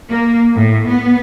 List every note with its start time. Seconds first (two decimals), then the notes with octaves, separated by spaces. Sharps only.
0.11 A#3
0.55 A2
0.88 B3